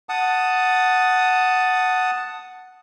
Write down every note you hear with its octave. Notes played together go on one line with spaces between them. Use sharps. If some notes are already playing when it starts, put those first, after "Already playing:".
F#5 A5 D#6